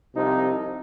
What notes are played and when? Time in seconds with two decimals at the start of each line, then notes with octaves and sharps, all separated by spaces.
0.15 C2 C3 F3 D#4